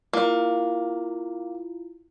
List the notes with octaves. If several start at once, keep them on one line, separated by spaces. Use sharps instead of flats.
A#3 E4 F4